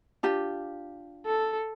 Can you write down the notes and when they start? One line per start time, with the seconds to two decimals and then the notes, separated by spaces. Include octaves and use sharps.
0.23 D4 F4 G4
1.26 A4